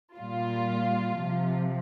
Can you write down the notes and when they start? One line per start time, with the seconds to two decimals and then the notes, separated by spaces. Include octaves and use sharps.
0.16 A#2 G3 F4
1.17 C3 F3